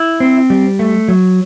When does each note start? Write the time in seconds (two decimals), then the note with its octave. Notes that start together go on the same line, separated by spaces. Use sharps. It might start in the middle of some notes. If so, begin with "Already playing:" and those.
Already playing: E4
0.20 C4
0.50 G3
0.79 A3
1.08 F#3